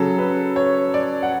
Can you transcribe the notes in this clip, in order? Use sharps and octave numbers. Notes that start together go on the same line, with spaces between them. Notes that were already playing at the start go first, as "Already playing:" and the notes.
Already playing: C#3 F#3 A4
B4
C#5
D5
F#5